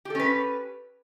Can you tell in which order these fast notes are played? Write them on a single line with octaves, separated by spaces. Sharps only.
G4 A4 C#4 B4